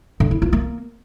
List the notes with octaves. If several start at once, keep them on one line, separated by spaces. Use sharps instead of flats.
D3
E4
F4
A#3